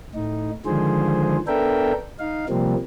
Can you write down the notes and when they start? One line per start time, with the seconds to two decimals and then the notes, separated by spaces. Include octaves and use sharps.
0.15 A2 D#4
0.66 D3 D#3 F3 G#3 G#4 C5
1.47 B3 D4 A4 A#4 E5 G5
2.20 D#4 F5
2.49 C3 F3 G3 A#3 C4